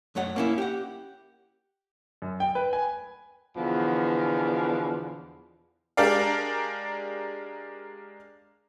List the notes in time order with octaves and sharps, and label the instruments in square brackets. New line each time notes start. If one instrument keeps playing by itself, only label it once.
[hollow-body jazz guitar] F#2 A3 C#5 F#5
A#3 C#4 E4
G4 F#5
[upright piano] F#2
G5
B4
G#5
[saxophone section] E2 B2 D3 F3
[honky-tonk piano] G#3 D4 G4 A#4 D5 F5